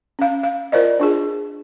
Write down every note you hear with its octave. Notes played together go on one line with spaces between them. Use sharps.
C#4 F5
F5
F4 A#4 C5 D5 D#5
D4 F4 G#4